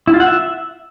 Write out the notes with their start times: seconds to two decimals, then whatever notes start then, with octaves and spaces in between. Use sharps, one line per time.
0.07 E4
0.14 F4
0.20 F#5
0.26 E5